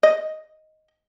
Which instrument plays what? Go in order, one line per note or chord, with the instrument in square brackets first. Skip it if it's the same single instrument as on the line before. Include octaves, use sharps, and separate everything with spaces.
[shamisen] D#5